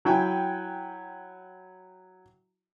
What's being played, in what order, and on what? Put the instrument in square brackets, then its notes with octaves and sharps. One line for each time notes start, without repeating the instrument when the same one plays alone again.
[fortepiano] F#3 E4 G5 G#5